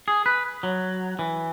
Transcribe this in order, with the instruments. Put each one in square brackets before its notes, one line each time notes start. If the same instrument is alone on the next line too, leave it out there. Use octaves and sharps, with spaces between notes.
[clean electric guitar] G#4
B4
F#3
E3